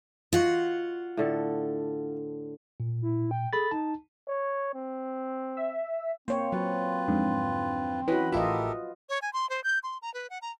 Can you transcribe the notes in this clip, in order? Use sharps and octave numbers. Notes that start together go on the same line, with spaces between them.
F4 F#4 C5 D#5 F#5
A2 D3 A4
A#2
E4
G5
G#4 A4 B5 A6
D#4 A5
C#5
C4
E5
A#3 C4 C5 C#5
F#3 F4 B4
F2 G#2 D3
E3 C#4 F#4 B4 D#5 B5
A1 E4 F4 G4 A4 A#4 D#5 E5
C#5
G#5
C6
C5
G6
C6
A#5
B4
F#5
A#5